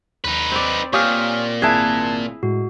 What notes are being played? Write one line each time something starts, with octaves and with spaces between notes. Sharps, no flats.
D#2 D#4 B4
C4 D5
A#2 G4 C#5 F5 G#5 C#6 D#6 F6
G#1 C4 E4 G#4 A5 F#6 G#6
A2 G#3 F#4